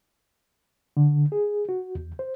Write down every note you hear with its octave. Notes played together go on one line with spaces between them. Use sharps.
D3
G#4
F#4
E2
C5